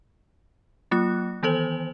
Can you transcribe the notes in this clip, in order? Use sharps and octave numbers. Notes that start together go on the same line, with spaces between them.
F#3 A#3 F4 F#6
D#3 E3 B3 A4 C5 F#7